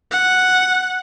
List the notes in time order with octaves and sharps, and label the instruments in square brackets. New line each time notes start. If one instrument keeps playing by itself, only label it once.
[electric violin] F#5